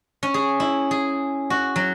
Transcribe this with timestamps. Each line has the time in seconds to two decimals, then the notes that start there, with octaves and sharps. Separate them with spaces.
0.23 C#4
0.34 G#4
0.60 E4
0.91 G#4
1.50 F#4
1.76 F#3